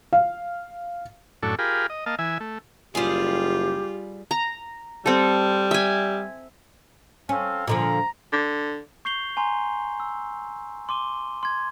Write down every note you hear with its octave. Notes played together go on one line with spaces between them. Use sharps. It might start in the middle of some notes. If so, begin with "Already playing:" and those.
F5
F#2 A2 D4 A4 C#6
F4 G4 G#4 A#4 B5
D#5
A#3 D#5 F5 A5
E3 E5 G#5
A3
F#1 G3 F4 G4 G#4
A#5
G3 C4 A4
E5 G#5
C4 C#4 A4 F5
A#2 D3 F3 A#5
D3
C#6 G6 C7 F7 G7
G#5 A#5 C6
E6
C6 D6 D#7 G7
C6 G#6